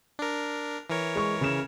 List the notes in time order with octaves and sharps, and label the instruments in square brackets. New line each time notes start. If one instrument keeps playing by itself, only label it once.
[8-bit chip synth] D4 A#4
E3 A#4 C#5
[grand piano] G#3 C#6
C#3 E7